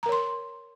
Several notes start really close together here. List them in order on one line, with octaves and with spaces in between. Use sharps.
A#5 A#4 C#5 C6